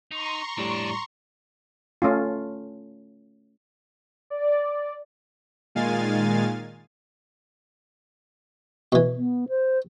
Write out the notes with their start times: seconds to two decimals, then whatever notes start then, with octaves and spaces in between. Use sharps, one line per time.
0.11 D#4 A#5 C6 C#6
0.58 F2 A2 G3 D4
2.02 A3 C#4 F4
4.30 D5
5.75 A#2 D#3 G#3 F5 G#5 A6
8.92 B2 E3
9.18 B3
9.49 C5